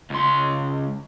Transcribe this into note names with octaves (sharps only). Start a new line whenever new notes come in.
C#2 C6